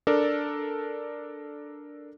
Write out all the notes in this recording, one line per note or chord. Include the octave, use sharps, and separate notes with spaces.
D4 A4 A#4 D5